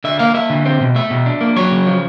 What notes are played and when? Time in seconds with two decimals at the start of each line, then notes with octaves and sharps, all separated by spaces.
0.04 D3 E5
0.19 A#3 F5
0.34 A#3 E5
0.50 D3
0.65 C4
0.80 B2
0.95 A3 E5
1.10 B2
1.26 D4
1.41 A#3
1.56 F#3 C#5
1.71 C#3
1.87 F3